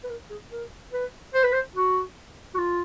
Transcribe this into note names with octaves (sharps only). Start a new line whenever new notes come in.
B4
A#4
G#4
A#4
B4
C5
B4
C5
F#4
F#4
F4